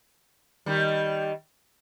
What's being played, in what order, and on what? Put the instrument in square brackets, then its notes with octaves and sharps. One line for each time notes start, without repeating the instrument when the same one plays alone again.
[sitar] D#3 G3